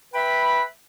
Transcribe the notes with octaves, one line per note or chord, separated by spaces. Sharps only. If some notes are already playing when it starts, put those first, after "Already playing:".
B4 E5 G5 B5